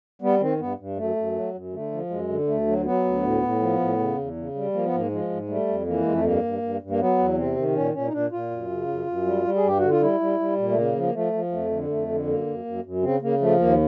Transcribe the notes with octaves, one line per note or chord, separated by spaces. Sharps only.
G3 B3
D#3 C4
G2 B3
G2
F#2 A3
F#2
F#3
F#2
D3 A3
F3
F#2 G#3
D3
D2 A3
F#3
F#3 B3
D2
A2
A2
F3
A2
C#3
E2
C#3
G3
F3 A#3
B3
G#2 A#3
F3 G#3
G#2
G3 A3
F2
E3 A#3
F2 G#3
A3
G2 A#3
G2
G2
G2
A#3
F#3 B3
E2
C3 C4
D#3
A#2 C#4
A#2 C#4
D#4
A#2 D4
A#2 F4
F#2
C#3
F#2
F#2
G3
G3
G#4
G2 G4
D3 F#4
F4
G3 E4
G3
G3
A#2
A3
C#3 A#3
F3
A#3
F3 A3
F3
F2 A3
D3
F2 A3
D3
F#2 A#3
F#2
F#2
F#2
C#3 C4
C#3 A#3
F3 A3
D#2 A#3